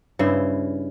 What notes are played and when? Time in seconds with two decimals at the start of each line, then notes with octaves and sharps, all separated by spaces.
0.19 G2 C#3 E4 C5